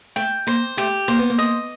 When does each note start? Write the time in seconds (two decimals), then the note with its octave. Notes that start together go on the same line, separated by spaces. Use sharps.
0.16 A3 G5
0.47 A#3 C5
0.77 A3 G4
1.08 A#3 C5
1.19 B3
1.30 A#3
1.38 D#5